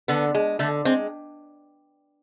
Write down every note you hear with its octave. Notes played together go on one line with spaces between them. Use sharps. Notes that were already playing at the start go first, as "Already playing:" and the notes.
D3 B3
G#3
D3 A3
G#3 C4